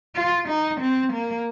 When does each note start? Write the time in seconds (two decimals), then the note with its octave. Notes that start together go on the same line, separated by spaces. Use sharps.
0.16 F4
0.49 D#4
0.81 C4
1.13 A#3